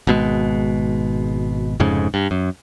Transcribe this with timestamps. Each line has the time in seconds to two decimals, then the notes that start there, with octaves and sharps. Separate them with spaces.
0.07 G#1 B2 G#3
1.80 F1 F2 G#2 C#3
2.14 G2
2.31 F#2